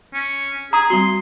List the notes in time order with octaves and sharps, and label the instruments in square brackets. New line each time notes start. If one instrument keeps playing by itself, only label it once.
[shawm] C#4
[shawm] G#4 [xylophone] A#5 D#6
[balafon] G3 C4 F#4 [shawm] C6